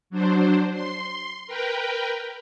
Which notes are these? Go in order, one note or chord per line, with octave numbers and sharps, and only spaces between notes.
F#3 D4 C5
C6
A#4 B4 G5